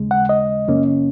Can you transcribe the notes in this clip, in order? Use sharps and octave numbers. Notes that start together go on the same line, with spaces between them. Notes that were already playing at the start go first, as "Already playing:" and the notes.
Already playing: D#2 C#3 G#3
F#5
D#5
F#2 C#3 A#3 C#4